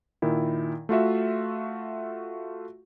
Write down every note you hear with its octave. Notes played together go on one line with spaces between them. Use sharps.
A#2 D#3 E4
A3 F4 F#4 E5